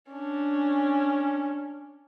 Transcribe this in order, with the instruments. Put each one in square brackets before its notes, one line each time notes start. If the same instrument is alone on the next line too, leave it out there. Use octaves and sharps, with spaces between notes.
[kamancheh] C#4 D4